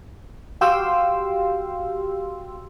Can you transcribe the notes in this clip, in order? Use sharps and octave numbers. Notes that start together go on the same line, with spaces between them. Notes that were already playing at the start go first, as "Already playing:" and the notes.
F#4 G4 F5 G5 C6 E6